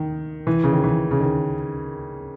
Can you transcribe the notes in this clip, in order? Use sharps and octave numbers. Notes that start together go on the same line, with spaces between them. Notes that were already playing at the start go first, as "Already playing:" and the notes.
Already playing: D#3
E3
C#3
D#3
E3
C#3
D#3